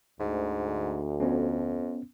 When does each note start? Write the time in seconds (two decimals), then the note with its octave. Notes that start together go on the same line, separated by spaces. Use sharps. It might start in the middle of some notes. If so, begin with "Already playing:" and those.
0.20 D2 G#2
1.20 F2 B3 C#4